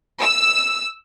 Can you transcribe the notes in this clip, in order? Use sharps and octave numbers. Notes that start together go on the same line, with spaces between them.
E6